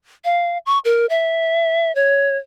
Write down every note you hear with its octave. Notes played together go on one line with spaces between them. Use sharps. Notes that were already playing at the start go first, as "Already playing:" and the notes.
F5
C#6
A#4
E5
C#5